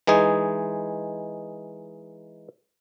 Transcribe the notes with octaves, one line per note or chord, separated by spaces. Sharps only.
E3 G#3 D#4 G#4